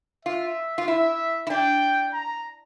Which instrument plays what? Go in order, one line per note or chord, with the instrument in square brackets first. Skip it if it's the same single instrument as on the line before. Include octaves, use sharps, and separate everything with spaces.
[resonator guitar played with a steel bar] F4 [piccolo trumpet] E5
[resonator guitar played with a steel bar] F4
[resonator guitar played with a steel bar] E4 [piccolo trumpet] E5
[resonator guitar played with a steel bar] E4
[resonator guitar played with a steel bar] D4 [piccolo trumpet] G5
[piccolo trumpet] A#5